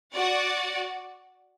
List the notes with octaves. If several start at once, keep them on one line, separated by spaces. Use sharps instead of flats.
F#4 D5 F#5